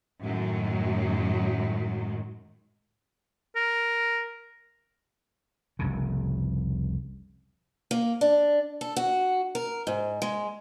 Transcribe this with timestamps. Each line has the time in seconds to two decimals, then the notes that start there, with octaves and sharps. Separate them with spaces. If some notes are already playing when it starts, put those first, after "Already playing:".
0.22 F#2 A2 D#3 F#3 G#3
3.56 A#4
5.79 F1 C2 C#3
7.91 A#3
8.21 D4
8.81 A4
8.96 F#4
9.55 A#4
9.87 G#2
10.22 G#3